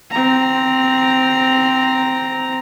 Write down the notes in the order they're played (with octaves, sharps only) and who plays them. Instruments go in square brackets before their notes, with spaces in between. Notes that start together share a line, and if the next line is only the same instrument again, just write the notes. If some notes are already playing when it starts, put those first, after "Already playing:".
[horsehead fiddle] C4 A#5